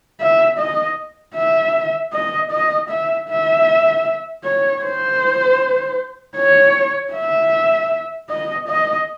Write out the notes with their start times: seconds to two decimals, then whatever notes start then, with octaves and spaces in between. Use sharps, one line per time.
0.21 E5
0.59 D#5
1.36 E5
2.13 D#5
2.51 D#5
2.90 E5
3.29 E5
4.44 C#5
4.83 C5
6.37 C#5
7.13 E5
8.30 D#5
8.68 D#5